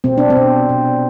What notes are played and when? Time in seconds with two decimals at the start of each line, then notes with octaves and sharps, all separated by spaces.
0.04 B2 C4
0.18 D4
0.30 C4
0.36 B2
0.69 B2